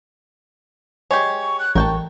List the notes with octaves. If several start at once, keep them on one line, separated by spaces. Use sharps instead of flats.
G#3 G4 C#5
C#6
F#6
A1 A#4 G5 A5 C#6